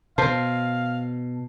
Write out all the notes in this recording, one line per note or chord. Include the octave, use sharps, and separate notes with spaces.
B2 C5 F5 A5